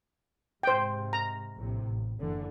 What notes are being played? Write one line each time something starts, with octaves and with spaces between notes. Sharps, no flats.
G#2 C3 C5 G5
A#5
A#1 A2 C3
A1
F#1 D3 E3